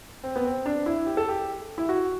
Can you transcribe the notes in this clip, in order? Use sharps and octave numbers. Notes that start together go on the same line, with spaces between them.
C4
B3
C4
D4
E4
G4
A4
G4
E4
F#4